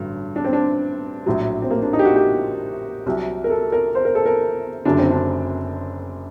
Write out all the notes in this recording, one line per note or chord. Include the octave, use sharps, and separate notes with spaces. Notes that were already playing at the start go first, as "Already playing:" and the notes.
Already playing: A1 G2 D3 F#3
D4
C4
D4
A#1 A2 F#3
C4
A#3
D4
D#4
G4
F#4
G4
C2 C3 F#3
A#4
A4
A#4
C5
A#4
A4
A#4
F#1 F#2 D3 F#3 D4
C4
D4